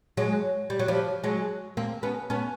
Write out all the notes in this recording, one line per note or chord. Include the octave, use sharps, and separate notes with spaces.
F#3 G#3
G3
F#3
F3 G3
F#3 G#3
A#3 C4
B3 C#4
B3 C#4